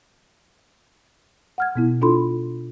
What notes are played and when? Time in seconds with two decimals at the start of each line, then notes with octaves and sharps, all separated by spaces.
1.58 F#5 F6 G#6
1.75 B2 B3 E4
2.02 D4 E4 F4 A4 B5 C6